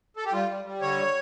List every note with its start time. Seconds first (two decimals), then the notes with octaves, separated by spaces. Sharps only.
0.17 A4
0.25 G4
0.33 G3 F4
0.49 G3
0.65 G3
0.81 D3 C#5